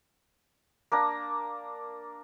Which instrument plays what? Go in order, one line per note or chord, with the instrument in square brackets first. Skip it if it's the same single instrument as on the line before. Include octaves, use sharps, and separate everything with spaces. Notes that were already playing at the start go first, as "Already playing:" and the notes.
[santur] A#3 D4 A#5